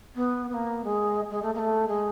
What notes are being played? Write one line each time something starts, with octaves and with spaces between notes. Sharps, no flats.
B3
B3
A#3
G#3
G#3
A3
A#3
A3
G#3